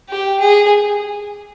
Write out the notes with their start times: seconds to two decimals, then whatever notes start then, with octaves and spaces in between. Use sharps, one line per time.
0.09 G4
0.40 G#4